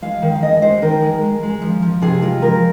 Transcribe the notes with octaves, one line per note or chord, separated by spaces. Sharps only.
G#3 F5
D#3
F5
G#3 D#5
G#3 C5
D#3 A#4
G#3
G#3
G#3
F3
F3
C3 G#4
G#3 F4
F3 A#4